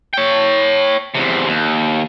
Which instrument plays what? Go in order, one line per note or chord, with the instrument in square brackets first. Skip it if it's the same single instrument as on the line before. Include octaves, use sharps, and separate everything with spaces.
[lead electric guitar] C#5 G5
E2 C3
D#2